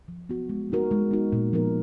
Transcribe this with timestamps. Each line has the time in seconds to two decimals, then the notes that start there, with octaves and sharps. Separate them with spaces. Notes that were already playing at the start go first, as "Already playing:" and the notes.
0.08 F3
0.29 B3 F#4
0.49 G#3
0.70 B3 D#4 F#4 A#4
0.91 G#3
1.11 B3 D#4 F#4 A#4
1.32 A#2
1.53 F3 B3 D#4 A#4